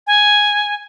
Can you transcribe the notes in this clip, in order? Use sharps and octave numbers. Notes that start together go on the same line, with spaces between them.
G#5